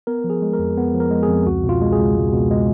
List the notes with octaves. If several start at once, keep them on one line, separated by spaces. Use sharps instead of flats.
B3 A#4
F3
G#4
G#3
A#4
F2
B3
F3
A#4
G#3
G#4
F2
C#2 F#4
B2 F4
G#3
G#4
C#2
C#2
B2
G#3